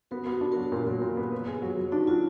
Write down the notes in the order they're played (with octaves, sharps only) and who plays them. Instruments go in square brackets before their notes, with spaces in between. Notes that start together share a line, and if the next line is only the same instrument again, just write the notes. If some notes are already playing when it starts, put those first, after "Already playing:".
[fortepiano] B3 [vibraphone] F#4 A#4
[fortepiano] B3
[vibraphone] F#4 A#4
[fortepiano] D4
[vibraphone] F#4 A#4
[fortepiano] F#3
A#2
F#3
A#2
B3
B4
G#4
F#3
F#3
[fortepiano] D4 [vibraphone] D#4 F#4
[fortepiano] F#3 [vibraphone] F4